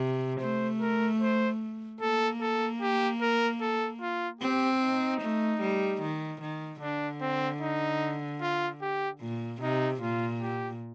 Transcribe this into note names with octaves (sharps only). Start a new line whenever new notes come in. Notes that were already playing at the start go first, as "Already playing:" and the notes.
Already playing: C3
A3 C5
A#4
C5
A#3 A4
A4
G4
A#4
A4
F4
C4 G4
D#4
A3
G3
D#3
D#3
D3 D4
C4
D#4
F4
G4
A#2
C3 D#4
A#2 F4
G4